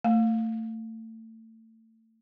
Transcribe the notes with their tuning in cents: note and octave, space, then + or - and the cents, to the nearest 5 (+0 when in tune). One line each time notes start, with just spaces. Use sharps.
A3 +30